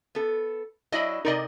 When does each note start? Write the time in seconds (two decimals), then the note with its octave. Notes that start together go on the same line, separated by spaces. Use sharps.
0.15 B3 A4
0.92 F#3 D4 E4 D#5 B5
1.25 C3 D#4 A#4 D5 D#5